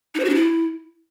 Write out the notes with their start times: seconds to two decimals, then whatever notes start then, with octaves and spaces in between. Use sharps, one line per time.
0.15 D#4
0.20 C5
0.25 F#4
0.30 D4
0.35 E4